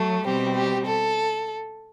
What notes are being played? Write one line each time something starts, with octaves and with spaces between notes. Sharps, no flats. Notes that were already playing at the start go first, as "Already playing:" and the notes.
Already playing: F#3 A3
B2 G3 C4 G4
G4
A4